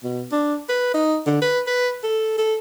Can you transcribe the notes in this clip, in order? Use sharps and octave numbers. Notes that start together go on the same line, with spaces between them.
B2
D4
B4
D#4
D3
B4
B4
A4
A4